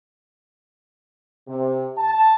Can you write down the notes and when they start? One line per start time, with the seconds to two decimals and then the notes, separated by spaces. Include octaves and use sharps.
1.48 C3
1.98 A5